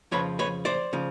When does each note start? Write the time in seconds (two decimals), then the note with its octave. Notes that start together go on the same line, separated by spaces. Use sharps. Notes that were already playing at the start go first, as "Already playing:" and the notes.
0.11 F2 C#3 F3 B4 C#5
0.39 B4 C#5
0.65 C5 D5
0.93 C#3 F3